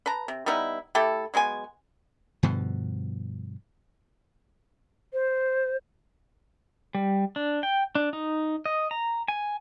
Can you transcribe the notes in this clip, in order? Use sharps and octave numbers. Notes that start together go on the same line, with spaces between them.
B4 A5 A#5
C3
G3 B3 D#4 E4
A3 E4 G4 A4
F#3 G#3 B3 G#5
G2 B2 D3 F3
C5
G3
D4
G5
D4
D#4
D#5
A#5
G#5